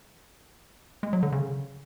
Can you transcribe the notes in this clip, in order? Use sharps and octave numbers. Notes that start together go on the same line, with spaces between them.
G#3
F#3
D3
C#3